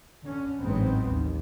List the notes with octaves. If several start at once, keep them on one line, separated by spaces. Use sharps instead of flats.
D3 C#4
A1 G#2 F#3 G#3 B3 C4
D#2